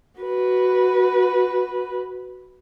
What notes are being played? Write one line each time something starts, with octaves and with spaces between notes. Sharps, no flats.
F#4 B4